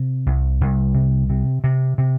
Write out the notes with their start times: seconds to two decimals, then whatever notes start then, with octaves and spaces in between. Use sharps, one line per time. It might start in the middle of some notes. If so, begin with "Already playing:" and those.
Already playing: C3
0.26 C2
0.61 C2
0.95 C3
1.29 C3
1.64 C3
1.98 C3